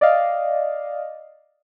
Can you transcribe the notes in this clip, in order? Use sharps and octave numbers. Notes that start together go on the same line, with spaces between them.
D5 D#5 F5